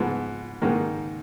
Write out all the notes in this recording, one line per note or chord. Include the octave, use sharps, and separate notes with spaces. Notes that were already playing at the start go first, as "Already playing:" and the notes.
Already playing: G#2 F3 B3
G#2 D#3 A#3 D#4